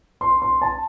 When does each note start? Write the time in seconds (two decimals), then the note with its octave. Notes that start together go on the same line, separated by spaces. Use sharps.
0.21 C6
0.42 C6
0.62 A5